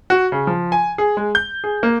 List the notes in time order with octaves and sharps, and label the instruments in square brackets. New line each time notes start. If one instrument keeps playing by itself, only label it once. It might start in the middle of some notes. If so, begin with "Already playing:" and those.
[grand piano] F#4
C#3
F3
G#5
G#4
G#3
G6
G#4
A#3